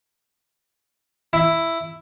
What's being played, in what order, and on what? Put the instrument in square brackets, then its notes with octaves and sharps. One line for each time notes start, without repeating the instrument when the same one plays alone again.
[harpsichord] E4